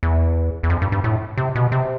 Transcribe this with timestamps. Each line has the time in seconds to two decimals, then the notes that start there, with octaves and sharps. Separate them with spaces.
0.03 E2
0.63 E2
0.70 F2
0.82 G2
0.92 G2
1.04 A2
1.37 C3
1.55 B2
1.72 C3